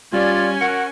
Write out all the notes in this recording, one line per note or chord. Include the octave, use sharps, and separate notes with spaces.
G3 C#4 F4 D5 G#5
F#4 A#4 F#5 C#7